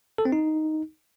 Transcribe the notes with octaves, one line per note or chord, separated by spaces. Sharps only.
A4
C4
D#4